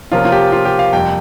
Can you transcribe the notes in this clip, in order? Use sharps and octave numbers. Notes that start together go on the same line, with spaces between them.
C3 F3 A#3 C#4 F4
F4
G4
F4
G4
F5
F2 C3 G3 A#3 G5